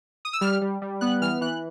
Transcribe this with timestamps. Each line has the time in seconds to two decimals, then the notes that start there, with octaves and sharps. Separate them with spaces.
0.25 D#6
0.33 E6
0.41 G3 F6
0.62 G3
0.82 G3
1.01 B3 F#6
1.21 E3 F6
1.41 E3 F#6